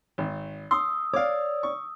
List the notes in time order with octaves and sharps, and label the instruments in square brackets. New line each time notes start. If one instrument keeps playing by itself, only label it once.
[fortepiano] G#1
[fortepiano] C6 [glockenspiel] D#6 E6
[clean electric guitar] C#5 D5 [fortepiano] F5 D6
[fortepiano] C#6